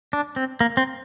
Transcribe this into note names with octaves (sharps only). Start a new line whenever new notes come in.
D4
C4
A#3
C4